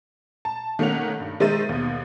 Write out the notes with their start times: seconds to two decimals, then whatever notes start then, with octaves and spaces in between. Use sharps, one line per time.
0.45 A5
0.79 D#3 A3 A#3 C#4 F#5 F7
1.20 G2
1.40 D#3 G#3 C5 E5 A6 D#7
1.69 D#2 B2